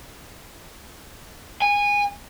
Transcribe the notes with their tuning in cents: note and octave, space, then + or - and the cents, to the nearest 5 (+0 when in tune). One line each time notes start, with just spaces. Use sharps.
G#5 -20